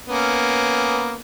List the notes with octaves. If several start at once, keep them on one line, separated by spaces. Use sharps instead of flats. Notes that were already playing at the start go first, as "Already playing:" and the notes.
A#3 B3 C#4